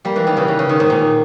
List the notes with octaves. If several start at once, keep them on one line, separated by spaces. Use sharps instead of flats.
G3 A#3
E3 G#3
D#3 G3
C#3 E3
C#3
C#3
D#3
G#2
A#2